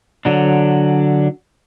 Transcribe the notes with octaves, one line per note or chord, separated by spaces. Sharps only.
D3 F#3 D4